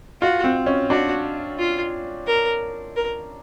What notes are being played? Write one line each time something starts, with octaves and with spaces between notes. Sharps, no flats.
F4 F#4
C4
C#4
D4 F#4
F4
A#4
A#4